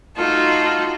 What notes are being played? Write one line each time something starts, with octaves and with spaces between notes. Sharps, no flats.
A3 D#4 F4 F#4 A4